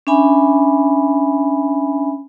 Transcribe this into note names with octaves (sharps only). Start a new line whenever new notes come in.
C#4 D4 E5 G#5 B5